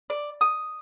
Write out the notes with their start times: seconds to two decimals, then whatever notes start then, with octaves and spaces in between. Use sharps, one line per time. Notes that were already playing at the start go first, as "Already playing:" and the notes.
0.10 D5
0.41 D#6